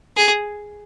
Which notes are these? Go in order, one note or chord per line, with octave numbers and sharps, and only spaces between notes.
G#4